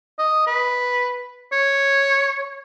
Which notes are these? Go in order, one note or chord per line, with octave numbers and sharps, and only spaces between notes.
D#5
B4
C#5